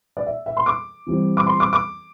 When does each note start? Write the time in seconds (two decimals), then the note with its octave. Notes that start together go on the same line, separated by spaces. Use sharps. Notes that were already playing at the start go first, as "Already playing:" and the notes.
0.17 D5
0.26 E5
0.46 E5
0.57 C6
0.66 D6
1.07 E3 G3 C4
1.37 D6
1.46 C6
1.60 D6
1.73 D6